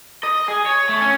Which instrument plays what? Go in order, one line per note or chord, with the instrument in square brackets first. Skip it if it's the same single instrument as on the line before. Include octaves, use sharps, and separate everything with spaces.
[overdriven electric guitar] D#5
G#4
C#5
A3
C#4